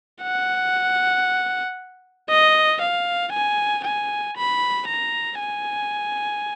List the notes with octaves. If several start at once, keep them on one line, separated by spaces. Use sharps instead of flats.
F#5
D#5
F5
G#5
G#5
B5
A#5
G#5